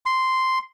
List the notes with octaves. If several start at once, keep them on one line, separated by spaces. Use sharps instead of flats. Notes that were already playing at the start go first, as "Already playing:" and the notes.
C6